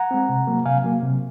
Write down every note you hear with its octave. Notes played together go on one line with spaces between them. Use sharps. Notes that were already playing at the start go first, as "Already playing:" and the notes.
Already playing: F#5 A#5
G#3 C4
C3
F#3 A#3
C3 F5 G#5
F#3 A#3
C3